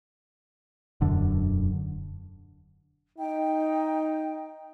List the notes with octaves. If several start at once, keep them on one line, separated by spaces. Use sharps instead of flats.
E1 F#2 D3
D#4 G5